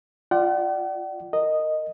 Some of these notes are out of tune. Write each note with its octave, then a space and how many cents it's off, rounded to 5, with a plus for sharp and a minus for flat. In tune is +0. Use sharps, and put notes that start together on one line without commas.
F4 +0 D5 +15 F#5 +45
A#4 -20 D#5 -5